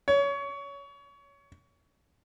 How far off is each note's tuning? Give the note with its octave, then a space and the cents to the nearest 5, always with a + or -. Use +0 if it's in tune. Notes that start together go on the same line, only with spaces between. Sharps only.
C#5 +25